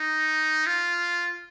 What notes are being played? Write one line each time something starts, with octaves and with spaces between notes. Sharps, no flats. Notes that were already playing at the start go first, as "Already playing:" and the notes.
Already playing: D#4
F4